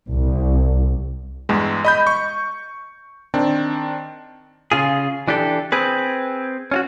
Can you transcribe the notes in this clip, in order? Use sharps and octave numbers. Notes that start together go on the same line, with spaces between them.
C2
E2 G2 G#3
D#5 B5 G6
C#6
D#3 C4 D4
C#3 F4 G#4
E3 D4 G4 A4
C4 G#4 B4
C#4 F4 F#4